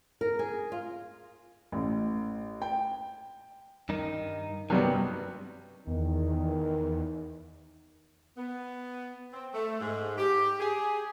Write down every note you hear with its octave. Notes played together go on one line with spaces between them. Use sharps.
A#4
G#4
F4
A1
G5
G2 D#3 D#4
G2 C3 D#3 F#3 G3 B3
E2 D#3
B3
C4
A3
G#2
G4
G#4